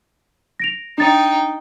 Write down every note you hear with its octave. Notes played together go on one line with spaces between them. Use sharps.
A#6 D7 F7
D4 D#4 G5 A6 C#7